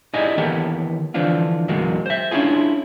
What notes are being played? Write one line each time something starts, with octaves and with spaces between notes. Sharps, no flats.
D#4 E4 G4 G#4 D5 D#5
D#3 E3 A#3 B3 G4 A4
D3 E3 F3 C4 D4 F4
E2 A#2 F#3 G#3 A#3
C5 E5
C#4 D4 E4 F4 G#4